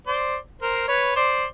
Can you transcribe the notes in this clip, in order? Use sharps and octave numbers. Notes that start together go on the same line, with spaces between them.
C5 D5
A#4 C5
B4 C#5
C5 D5